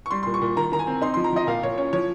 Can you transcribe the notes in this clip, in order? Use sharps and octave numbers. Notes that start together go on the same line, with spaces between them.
C#6
G3 C6
A#2 C6
C#6
A#2
D#3 A#5
D#3 A#5
G#5
C4
D#4 C6
F3 C6
A#5
F3 D#5
A#2 F5
A#2 C#5
C#4 C#5
F3 C#5